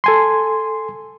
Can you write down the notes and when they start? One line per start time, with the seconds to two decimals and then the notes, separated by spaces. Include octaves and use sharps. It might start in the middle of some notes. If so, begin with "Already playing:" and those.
0.04 A4 G#5 C6